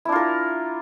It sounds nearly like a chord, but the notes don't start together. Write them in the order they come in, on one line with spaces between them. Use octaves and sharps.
E4 D4 F4 A#4